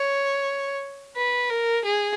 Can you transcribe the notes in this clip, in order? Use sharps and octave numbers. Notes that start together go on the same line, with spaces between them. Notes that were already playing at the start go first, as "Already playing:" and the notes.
Already playing: C#5
B4
A#4
G#4